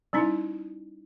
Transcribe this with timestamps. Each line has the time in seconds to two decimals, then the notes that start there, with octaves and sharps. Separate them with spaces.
0.13 G3 C#4 D#4 E4